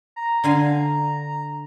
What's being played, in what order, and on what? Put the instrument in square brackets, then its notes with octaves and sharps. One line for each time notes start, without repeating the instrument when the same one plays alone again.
[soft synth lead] A#5
[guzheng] D3 F5 G#5